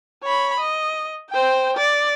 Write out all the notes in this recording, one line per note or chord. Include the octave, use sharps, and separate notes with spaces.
C#5 B5
D#5
C5 G5
D5